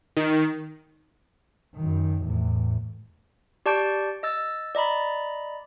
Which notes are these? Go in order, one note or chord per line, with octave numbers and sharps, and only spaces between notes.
D#3
F#2 D#3
E2 A2
G4 D5 A5 C#6 G6 D7
D#5 E6 A6
D5 D#5 A#5 B5